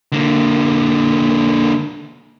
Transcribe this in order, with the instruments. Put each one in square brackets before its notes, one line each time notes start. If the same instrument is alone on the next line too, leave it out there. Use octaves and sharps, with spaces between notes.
[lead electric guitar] D3 A#3